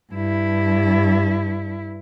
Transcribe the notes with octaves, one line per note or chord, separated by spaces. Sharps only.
G2 E4